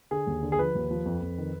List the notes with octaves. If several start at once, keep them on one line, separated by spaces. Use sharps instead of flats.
D3 G#4
D#2
D3
G#4
F3 B4
D#2
F3
F2
F2
D#3